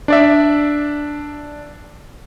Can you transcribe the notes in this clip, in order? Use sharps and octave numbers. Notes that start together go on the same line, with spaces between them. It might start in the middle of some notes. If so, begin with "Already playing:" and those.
D4 D5 E5